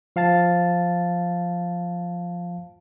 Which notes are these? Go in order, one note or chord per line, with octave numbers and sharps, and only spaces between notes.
F3 F5 A5 A6